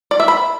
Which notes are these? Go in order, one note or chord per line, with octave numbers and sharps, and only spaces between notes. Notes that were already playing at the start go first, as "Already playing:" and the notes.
D5
E5
B5